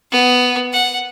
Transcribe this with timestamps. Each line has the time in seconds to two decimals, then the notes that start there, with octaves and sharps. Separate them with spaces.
0.11 B3
0.72 F#5